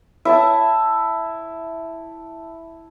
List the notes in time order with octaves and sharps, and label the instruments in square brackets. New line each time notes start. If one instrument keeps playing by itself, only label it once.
[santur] E4 E5 A5